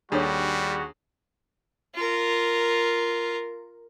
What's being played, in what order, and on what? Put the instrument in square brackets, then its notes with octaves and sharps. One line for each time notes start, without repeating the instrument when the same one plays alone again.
[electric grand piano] D#2 G#4 [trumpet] G3 [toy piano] D4 A4 C#5 [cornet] F#4
[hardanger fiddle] F4 A#4